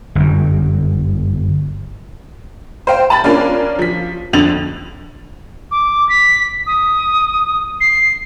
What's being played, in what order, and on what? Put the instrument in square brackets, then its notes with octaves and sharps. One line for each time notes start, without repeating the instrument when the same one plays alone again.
[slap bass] G1 F#2
[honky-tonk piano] C5 F5 G5
A5 B5 A6
A#3 C#4 D4 F4
F3 B6
F2 D3 A6 F7 F#7
[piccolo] D6
B6
D#6
C7